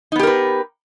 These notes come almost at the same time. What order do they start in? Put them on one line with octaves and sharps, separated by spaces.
D#4 B3 G4 A#4 B4